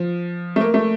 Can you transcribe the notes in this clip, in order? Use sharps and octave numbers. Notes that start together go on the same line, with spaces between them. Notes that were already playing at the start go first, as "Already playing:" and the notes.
Already playing: F3
A3
A#3
A3